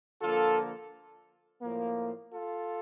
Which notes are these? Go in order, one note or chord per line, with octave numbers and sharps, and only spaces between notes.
D3 F3 A#3 F4 A4
A2 F3 A#3
F4 A4